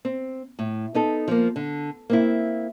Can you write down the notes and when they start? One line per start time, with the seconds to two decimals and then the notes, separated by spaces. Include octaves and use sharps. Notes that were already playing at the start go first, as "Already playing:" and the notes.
0.05 C4
0.59 A2
0.95 B3 D#4 A4
1.28 F3 A#3
1.56 D3
2.10 A#3 C4 E4